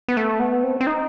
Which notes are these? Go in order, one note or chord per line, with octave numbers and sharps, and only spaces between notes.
B3
A3
B3
C4
C4
D#4